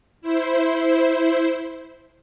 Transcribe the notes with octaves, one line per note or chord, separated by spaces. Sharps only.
E4 C5